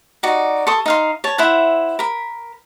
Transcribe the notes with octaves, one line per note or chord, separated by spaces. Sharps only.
D#4 F#4 D5
A4 C6 C#6 D#6
D#4 F5 C6
C#5 A5
E4 C5 E5 F#5
A#4 B5